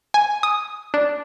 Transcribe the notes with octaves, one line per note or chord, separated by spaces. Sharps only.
G#5
D#6
D4